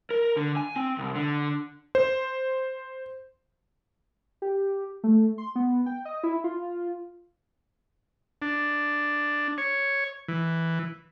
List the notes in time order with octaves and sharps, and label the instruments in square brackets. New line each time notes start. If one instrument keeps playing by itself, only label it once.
[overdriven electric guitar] A#4
D3
G#5
C4
C2
D3
[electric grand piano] C5
[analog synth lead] G4
A3
C6
B3
G5
D#5
E4
F4
[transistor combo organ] D4
C#5
E3